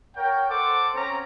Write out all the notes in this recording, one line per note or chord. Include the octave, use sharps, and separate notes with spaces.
A#4 C#5 F#5 G5
A4 C5 F#5 A5 C6 D6
C4 C#4 A#5